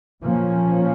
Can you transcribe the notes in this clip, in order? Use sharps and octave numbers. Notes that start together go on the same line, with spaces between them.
A#2 F3 A#3 C#4